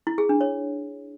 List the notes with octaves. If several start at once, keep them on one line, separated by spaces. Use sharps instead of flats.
E4
G#4
D4
C#5